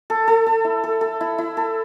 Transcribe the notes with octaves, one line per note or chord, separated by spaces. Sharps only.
A4
A4
A4
E4
A4
A4
E4
E4
A4